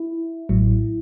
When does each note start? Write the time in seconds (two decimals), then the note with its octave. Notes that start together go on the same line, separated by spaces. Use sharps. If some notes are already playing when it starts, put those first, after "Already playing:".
Already playing: E4
0.49 A1 A2 F#3